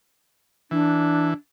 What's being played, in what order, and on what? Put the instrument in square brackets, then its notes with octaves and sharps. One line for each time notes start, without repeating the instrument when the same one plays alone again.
[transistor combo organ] E3 [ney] D4